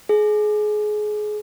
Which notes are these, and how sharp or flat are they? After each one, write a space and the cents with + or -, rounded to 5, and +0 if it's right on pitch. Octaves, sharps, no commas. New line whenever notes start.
G#4 +25